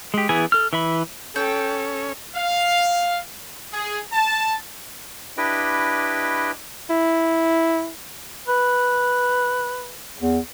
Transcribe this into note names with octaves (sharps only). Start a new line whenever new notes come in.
G#3 G4
E3 B3 E4 G#4 G#5
A4 F6
E3 E5 B5
C#4 A4 G5
F5
G#4
A5
D4 E4 G4 B4 D#5 G5
E4
B4
E2